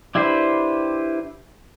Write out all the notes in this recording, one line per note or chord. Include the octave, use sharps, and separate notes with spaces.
D4 E4 G4 B4 C5